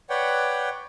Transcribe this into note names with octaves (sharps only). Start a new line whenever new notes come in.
B4 C#5 D5 F#5 G5